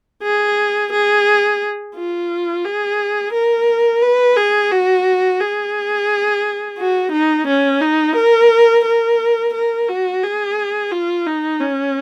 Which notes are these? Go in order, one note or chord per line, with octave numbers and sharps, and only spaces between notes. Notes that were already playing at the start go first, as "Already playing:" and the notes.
G#4
G#4
F4
G#4
A#4
B4
G#4
F#4
G#4
F#4
D#4
C#4
D#4
A#4
A#4
A#4
F#4
G#4
F4
D#4
C#4